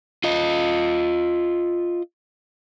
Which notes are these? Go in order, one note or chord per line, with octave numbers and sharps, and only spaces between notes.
F4 D#5